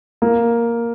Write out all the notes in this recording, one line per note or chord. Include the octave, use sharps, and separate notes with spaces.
A#3